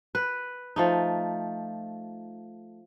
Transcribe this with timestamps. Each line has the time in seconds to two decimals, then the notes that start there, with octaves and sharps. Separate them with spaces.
0.15 B4
0.76 F3 A3 D#4